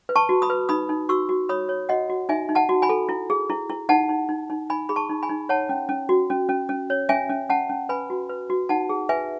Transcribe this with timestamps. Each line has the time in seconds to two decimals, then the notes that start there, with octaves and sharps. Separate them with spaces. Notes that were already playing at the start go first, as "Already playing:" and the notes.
0.09 B4
0.16 A5 C#6
0.29 F#4
0.42 B5 D#6
0.50 B4
0.69 D#4 B5 D#6
0.89 D#4
1.09 F#4 C#6 E6
1.29 F#4
1.49 C#5 B5 D#6
1.69 C#5
1.89 F#4 D#5 F#5
2.10 F#4
2.29 D#4 E5 G#5
2.49 D#4
2.55 F#5 A5
2.69 F#4
2.82 G#5 B5
2.89 A4
3.09 E4
3.30 G#4
3.50 E4
3.70 E4
3.89 D#4 F#5 A5
4.09 D#4
4.29 D#4
4.50 D#4
4.70 D#4 G#5 B5
4.89 G#4 B5
4.96 A5 C#6
5.10 D#4
5.23 G#5 B5
5.30 D#4
5.49 C#5 F#5 A5
5.69 C#4
5.89 C#4
6.09 F#4
6.30 C#4
6.49 C#4
6.69 C#4
6.90 C#5
7.09 C#4 E5 G#5
7.30 C#4
7.49 C#4 F#5 A5
7.69 C#4
7.89 B4 G#5 B5
8.10 F#4
8.29 B4
8.50 F#4
8.69 D#4 F#5 A5
8.89 G#4
9.09 B4 E5 G#5